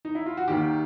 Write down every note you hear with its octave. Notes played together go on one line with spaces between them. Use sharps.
D#4
E4
F4
F#4
D#2 D#3 G4